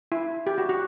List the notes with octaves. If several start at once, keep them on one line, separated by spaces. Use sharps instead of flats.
E4
G4
F#4
F#4